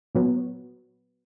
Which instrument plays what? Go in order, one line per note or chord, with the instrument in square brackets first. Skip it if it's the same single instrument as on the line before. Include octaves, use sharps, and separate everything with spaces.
[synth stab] A#2 F#3 B3